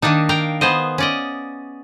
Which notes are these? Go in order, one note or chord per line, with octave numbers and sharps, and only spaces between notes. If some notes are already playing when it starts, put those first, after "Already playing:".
D#3 A#3 D4 D#4
A#4 F5 G5
B3 G#4 C5 D#5
C#4 D5 D#5